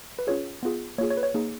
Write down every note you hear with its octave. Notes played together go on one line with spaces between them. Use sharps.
B4
C#4 F4 G#4 C#5
B3 F4 G#4
A#3 F4 G#4 C#5
C#5
B4
C#5
A#3 D#4 G#4